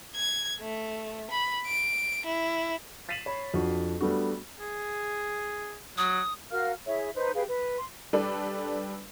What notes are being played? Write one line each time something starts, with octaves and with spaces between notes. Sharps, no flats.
G#6
A3
B5
D7
E4
A6 B6 C7 D#7 E7 F#7
C#5 B5
F2 D4 F#4
G3 A3 B3 D4 F#4
G#4
F#3 D#6
F#4 A#4 F5 F6
E4 G#4 C#5 E5
D#4 B4 C5
G4 G#4 B4 F5
B4
C6
G3 D4 A4 B4 D5